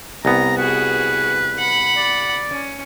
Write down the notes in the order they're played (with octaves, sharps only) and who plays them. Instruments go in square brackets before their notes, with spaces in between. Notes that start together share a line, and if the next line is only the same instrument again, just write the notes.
[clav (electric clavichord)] C2 B3 [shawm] A#5
[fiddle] F#4 G#4 [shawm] B4
[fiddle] F#5 B5
[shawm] D5
[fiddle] C#4